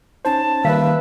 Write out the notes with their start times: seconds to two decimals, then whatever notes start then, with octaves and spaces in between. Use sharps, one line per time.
0.25 C#4 D#4 C5 A5
0.65 D#3 G3 A#3 B4 E5 F5